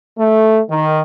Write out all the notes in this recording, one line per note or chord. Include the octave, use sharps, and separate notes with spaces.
A3
D#3